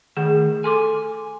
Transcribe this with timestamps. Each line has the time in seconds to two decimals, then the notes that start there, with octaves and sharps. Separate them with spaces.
0.17 D#3 A3 G#4
0.64 A4 G#5 C6 D6